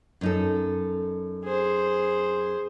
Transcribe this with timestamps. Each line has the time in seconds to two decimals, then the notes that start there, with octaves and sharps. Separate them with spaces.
0.21 F#2 D#4 A4
1.44 G#4 C5